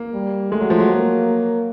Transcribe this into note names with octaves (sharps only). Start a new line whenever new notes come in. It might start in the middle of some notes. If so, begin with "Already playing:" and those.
Already playing: A#3
G3
G#3 A3
F#3
F3
F#3
A#3